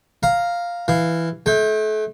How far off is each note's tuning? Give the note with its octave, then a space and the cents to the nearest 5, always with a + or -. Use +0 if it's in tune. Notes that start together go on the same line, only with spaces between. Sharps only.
F5 +0 A#5 +0
E3 +5 F5 -5
A3 -35 G5 +20